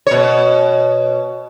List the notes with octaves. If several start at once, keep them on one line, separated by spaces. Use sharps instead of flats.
B2 C#5